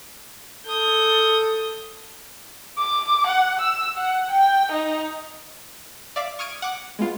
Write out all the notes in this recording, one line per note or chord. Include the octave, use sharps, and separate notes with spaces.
A4 D#6 G6
D6
F#5
E6
F#5
G5
D#4
D5 E5 F5 D6
C#6 D#6 F6 G#6 D7 D#7
F#5 D6
G#3 B3 F4